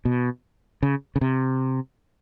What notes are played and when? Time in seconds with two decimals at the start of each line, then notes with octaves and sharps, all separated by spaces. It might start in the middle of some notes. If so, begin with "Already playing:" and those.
0.05 B2
0.83 C#3
1.16 C#3
1.21 C3